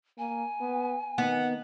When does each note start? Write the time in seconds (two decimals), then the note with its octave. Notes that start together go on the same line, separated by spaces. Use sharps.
0.18 A#3 G#5
0.60 B3
1.18 D#3 B3 F#5